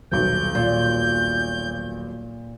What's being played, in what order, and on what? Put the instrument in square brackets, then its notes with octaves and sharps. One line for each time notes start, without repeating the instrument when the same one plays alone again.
[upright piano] D#1 B1 [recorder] G6
[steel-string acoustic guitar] A#2